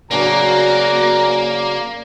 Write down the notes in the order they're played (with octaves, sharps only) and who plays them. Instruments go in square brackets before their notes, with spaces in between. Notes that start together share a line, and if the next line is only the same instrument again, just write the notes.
[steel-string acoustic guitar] C#3 F#3 D4 [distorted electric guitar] A#3 [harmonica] F#4 G#5 A#5